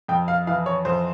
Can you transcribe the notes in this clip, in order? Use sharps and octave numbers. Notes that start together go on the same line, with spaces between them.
F2 G5
F5
E3 F5
C#5
F2 C5